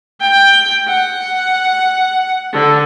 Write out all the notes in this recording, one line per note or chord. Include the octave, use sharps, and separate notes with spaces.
G5
F#5
D3